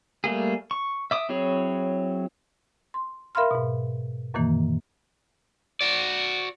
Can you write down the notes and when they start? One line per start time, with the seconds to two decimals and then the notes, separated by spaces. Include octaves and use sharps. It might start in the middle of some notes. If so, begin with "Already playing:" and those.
0.24 G3 A3 A#3 G#4
0.71 C#6
1.11 E5 D6 D#6
1.29 F#3 C4 E4 G#4 C#5
2.94 C6
3.35 A#4 E5 F5 B5 C6 F6
3.51 G#2 B2
4.34 F#2 A#2 D#3 E3 A#3
5.81 F#4 D5